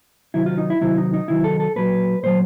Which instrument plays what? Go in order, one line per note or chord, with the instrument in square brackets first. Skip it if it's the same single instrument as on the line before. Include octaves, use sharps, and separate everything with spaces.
[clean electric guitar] C3 D#3 F#3 E4
F4
D#4
E4
C3 D#3 F#3 E4
D#4
D#4
C3 D#3 F#3 E4
A4
A4
A#2 F#3 B4
A#2 F#3 C5